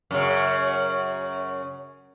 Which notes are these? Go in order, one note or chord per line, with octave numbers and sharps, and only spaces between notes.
F#2 C#3